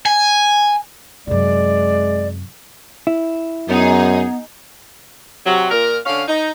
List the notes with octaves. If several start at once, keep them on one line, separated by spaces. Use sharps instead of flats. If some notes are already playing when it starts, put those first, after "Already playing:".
G#5
F#2 C3 G#3 D5
E4
F#2 B3 D#4 G#4
C3 F#3
A#2 A#4
D3 C#4 F5
D#4